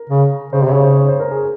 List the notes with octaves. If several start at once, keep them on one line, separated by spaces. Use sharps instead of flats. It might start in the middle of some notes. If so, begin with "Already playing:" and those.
Already playing: A#4
C#3
C#3 C5
C3 C#5
C#3
C5
C#5
C5
A#4
G#4